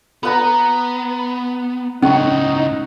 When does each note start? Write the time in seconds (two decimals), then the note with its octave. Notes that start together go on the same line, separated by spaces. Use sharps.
0.23 B3 B4 F#5 A#5
2.02 C#2 A2 C#4 D#4 F#5 C#6